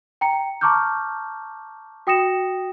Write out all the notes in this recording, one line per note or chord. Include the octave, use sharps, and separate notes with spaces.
G5 A#5 C#7
A5 A#5 C#6 D6 F6 G6
F#4 G5 D#6 A#6 C#7 E7